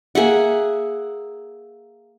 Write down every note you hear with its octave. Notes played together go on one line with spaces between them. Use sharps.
A#3 G#4 E5 F#5